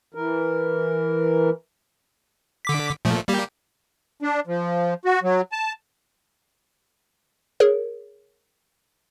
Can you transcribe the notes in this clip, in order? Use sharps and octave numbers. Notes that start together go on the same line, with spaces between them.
E3 A#4
D3 D6 B6
A#2 F3 A3
G3 A#3 G4
D4
F3
F#4
F#3
A5
G#4 A#4 C#5